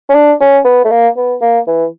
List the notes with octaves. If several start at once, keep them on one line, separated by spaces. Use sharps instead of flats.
C#4
D4
C#4
B3
A3
A#3
B3
A#3
E3